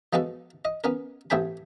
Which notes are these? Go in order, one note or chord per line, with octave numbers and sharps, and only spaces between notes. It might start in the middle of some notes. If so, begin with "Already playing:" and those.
F3 G#3 B3 F#4 A4
D#5
B3 C#4 A#4
A1 A3 C4 G#4 G5 B5